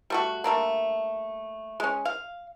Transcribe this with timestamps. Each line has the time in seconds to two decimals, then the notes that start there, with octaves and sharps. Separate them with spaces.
0.10 G3 A3 F#4
0.44 G3 A3 A#3 D4
1.80 G#3 C#4
2.05 F5